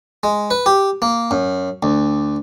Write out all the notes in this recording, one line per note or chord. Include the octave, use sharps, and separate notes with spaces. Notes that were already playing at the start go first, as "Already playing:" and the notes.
G#3
B4
G4
A#3
F#2
D2